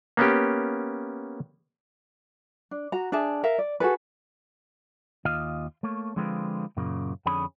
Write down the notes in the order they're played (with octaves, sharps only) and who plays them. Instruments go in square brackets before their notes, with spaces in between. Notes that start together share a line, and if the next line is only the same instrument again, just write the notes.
[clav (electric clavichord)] A#3 B3 C#4 G4
[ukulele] D4
F#4 A#5
D4 G#4 E5 A5
A#4 E5 F5
D5
F#4 G#4 A4 B4
[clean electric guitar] D#2 F4 D#5 F5
A3 A#3 C#5
D3 F3 G#3 C4 F4 B4
F#2 A#2 C#3 A#3
F2 D3 C#4 G#4 B5